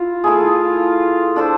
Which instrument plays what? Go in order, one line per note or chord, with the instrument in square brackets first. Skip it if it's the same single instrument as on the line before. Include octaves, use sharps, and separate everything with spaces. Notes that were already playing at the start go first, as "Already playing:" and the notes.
Already playing: [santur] E4 [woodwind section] F4
[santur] A3 E4 G#4
D4 A4 C5